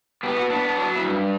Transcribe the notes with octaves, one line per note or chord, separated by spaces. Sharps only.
B3 G4
F#4
B3 D4
D4
F#3 D4
E4
G2